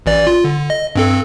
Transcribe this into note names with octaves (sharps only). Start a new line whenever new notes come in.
A1 E3 D5
F4
D3
D#5
G2 C4 A4